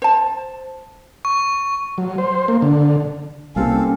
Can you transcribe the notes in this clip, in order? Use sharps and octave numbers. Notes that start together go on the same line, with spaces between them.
C5 A5
C#6
F#3
C5
A#3
D3
C2 G3 A#3 C4 C#4 G4 A4 F5